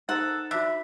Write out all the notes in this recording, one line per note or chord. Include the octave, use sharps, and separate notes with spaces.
D#4 A4 A#4 C5 F#5
D4 F#4 E5 B5 E6